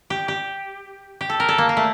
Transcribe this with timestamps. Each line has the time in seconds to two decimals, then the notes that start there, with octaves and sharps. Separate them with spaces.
0.10 G4
0.28 G4
1.21 G4
1.30 A4
1.40 A#4
1.48 A4
1.58 A#3
1.69 A#3
1.77 A3